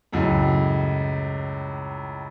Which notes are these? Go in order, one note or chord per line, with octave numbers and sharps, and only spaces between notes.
C#2 F#2 A2